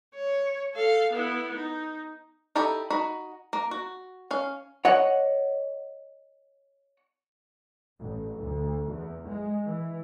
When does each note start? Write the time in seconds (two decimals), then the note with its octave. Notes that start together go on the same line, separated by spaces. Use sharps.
0.14 C#5
0.75 A4 F5
1.12 B3 E4
1.56 D#4
2.56 D#4 E4 G4 A4
2.90 D#4 F#4 B5
3.53 A#3
3.71 F#4
4.31 C#4 F5
4.85 C#5 D#5 F#5
7.99 A1
8.40 D2
8.90 E2
9.28 G#3
9.65 E3